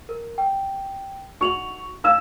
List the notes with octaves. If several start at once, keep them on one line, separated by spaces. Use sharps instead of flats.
A#4
G5
D#4 F#4 C#6 F7 F#7
D#4 F5 E6 E7